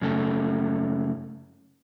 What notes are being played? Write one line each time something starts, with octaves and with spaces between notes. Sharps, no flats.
F#2 C#3 A3